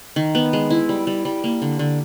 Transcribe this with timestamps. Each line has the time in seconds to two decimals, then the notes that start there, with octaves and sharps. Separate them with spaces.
0.16 D#3
0.35 B3
0.53 G#3
0.70 E4
0.89 G3
1.07 G3
1.25 G3
1.44 A#3
1.62 D3
1.79 D3